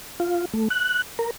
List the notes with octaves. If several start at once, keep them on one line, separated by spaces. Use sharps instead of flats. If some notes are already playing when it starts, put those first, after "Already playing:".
F4
A3
F#6
A#4